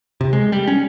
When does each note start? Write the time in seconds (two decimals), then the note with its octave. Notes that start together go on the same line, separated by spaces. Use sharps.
0.21 C3
0.33 G#3
0.52 G3
0.68 C#4